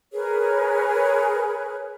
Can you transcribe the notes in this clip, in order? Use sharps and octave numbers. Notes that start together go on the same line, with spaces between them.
G#4 A#4 B4 C#5